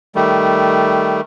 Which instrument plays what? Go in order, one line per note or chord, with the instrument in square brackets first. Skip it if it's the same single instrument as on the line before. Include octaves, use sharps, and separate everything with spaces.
[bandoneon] D#3 G3 A3